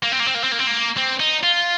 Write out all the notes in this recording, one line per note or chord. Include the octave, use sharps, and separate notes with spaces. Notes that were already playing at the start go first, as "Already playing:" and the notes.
A#3
C4
A#3
C4
A#3
C4
A#3
C4
A#3
C4
D#4
F4